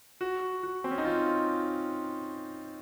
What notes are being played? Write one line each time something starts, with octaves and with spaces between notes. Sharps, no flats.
F#4
F#4
C4
C#4
D#4
F4